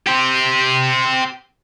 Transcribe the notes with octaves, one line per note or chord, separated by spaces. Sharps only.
G4 C5